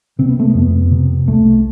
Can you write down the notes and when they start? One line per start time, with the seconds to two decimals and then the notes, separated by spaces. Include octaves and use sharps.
0.19 C3 C4
0.29 B3
0.39 A3
0.49 B3
0.55 F2
0.91 C3
1.27 C2 A3